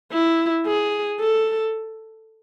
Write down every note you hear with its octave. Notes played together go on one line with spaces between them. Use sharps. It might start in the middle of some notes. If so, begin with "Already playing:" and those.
E4
G#4
A4